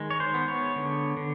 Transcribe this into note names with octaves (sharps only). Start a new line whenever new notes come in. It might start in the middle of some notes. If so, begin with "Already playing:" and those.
Already playing: D#3 G#3
C#5
C5
B3
C#5
D3
D3